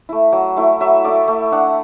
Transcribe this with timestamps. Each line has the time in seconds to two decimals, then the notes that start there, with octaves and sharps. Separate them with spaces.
0.09 A3 E4
0.32 F#3
0.57 A3 E4
0.80 F#3 E5
1.04 A3 E4 D5
1.28 A3
1.52 D4 F#5